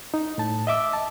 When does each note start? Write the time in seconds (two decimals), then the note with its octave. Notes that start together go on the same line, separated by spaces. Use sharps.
0.14 D#4
0.38 A2 A5
0.67 D#5 E5 D6 E6
0.93 A5